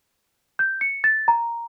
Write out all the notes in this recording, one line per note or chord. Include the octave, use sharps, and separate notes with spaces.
G6
C#7
A6
A#5